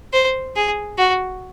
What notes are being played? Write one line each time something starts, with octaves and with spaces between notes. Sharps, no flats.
C5
G#4
F#4